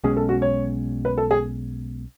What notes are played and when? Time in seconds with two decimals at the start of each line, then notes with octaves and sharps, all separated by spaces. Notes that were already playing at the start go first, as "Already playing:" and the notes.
0.04 B1 B2 G#3 C#4 G#4
0.17 A4
0.29 F#4
0.42 C#5
1.05 B4
1.18 A4
1.31 G#4